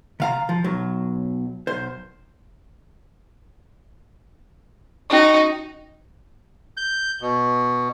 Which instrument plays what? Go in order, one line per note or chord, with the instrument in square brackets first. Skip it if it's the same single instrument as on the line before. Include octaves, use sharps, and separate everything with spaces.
[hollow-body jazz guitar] C3 F5 A#5
F3
B1 F#3
B1 C5
[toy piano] C#4 C#6 [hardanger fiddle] D#4 F#4
[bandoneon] G6
B2